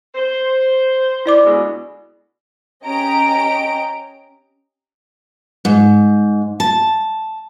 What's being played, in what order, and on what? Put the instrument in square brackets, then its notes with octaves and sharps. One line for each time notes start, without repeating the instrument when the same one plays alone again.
[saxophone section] C5
[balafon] E4 D5 D6
[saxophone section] D2 B2 G#3
[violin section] C#4 G4 D#5 A#5 D7
[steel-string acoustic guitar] G#2
A5